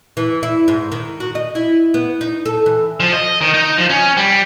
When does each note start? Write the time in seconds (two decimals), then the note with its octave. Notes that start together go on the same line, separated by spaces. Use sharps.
0.17 E3
0.43 E4
0.68 G#2
0.92 D#3
1.20 F#4
1.35 D#5
1.55 E4
1.94 B3
2.21 D#4
2.45 A4
2.66 E3
3.00 F3
3.13 D#5
3.41 D#3
3.54 D#4
3.78 F3
3.90 C#4
4.17 G3